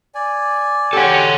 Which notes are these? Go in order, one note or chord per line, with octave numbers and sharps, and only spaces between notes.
D5 G#5
F#3 G#3 C#4 G4 A4 F#5